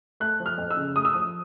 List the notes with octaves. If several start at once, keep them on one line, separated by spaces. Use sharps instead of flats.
A3 F#6
F3
F6
F2
E6
C#3
A3 D#6
E6
F3 D#6